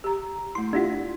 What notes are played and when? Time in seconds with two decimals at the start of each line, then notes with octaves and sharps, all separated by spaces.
0.04 G4 A#5
0.55 A3 E4 C6
0.73 D4 E4 F4 G4 F#5